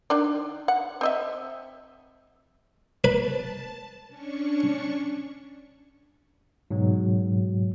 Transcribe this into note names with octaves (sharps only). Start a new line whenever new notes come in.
D#3 D4 D5
F#5
C4 D#5 E5
B4 A5
C#4 D4 C#6
G#2 B2 F#3